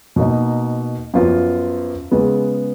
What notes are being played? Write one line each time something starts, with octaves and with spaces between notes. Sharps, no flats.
B2 A#3 D#4
F#2 F3 B3 F4
C#3 G#3 B3